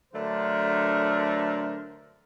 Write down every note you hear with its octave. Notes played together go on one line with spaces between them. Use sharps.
D3 F#3 A3 D4 A#4 C5